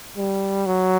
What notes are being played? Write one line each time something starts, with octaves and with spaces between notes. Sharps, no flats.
G3
F#3